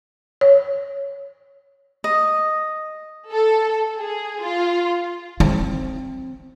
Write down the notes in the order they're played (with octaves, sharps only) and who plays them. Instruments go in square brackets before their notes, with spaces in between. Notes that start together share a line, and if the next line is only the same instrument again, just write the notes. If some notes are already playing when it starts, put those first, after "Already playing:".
[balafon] C#5
[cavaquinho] D#5
[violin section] A4
G#4
F4
[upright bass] C4